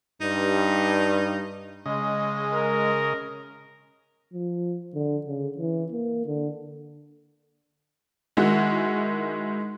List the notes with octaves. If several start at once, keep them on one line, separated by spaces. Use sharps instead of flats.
G2 D#4
C#3 G#3 D#5
A#4
F3
D3
C#3
E3
A#3
D3
D#3 G#3 E4 F#4